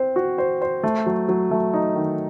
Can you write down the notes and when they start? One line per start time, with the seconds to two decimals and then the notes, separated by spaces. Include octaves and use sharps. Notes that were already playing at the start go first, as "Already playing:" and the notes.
Already playing: C4 C5
0.16 F#4
0.38 C5
0.62 C5
0.83 A3
1.06 F#3
1.28 F#3
1.51 A3
1.74 D#4
1.95 D#3